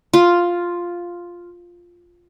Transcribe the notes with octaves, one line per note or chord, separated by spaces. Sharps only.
F4